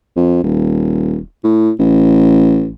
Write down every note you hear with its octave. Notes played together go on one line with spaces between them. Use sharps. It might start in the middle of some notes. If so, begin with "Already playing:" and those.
F2
D#1
A2
A1